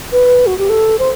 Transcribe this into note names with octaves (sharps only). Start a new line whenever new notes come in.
B4
F#4
G4
A4
C5